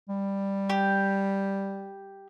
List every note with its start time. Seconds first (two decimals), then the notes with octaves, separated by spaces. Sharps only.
0.09 G3
0.70 G4